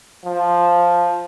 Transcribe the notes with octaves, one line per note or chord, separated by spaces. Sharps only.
F3